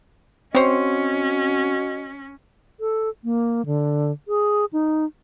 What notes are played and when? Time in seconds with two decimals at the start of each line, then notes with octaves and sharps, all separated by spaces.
0.55 C4 C#4 F#4 C5 C#5 D#5
2.80 A4
3.24 A#3
3.66 D3
4.28 G#4
4.73 D#4